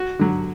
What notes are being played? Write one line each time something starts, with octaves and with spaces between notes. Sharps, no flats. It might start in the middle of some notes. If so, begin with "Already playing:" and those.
Already playing: F#4
D3 F#3